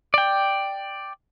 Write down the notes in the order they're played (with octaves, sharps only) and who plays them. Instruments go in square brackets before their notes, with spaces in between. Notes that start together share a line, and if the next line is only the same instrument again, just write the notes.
[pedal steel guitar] D5 G5